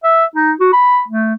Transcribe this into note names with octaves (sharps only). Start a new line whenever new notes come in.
E5
D#4
F#4
B5
A3